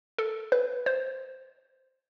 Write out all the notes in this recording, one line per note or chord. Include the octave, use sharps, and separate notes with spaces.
A4
B4
C5